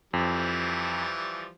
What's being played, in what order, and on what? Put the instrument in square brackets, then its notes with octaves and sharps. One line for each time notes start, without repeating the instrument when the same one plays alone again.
[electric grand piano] F2 [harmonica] E3 F3 G3